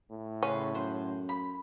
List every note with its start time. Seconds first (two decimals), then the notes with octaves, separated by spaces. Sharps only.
0.11 A2
0.43 C#3 C#4 B4 C6
0.75 F#2 C5 F#5
1.29 B5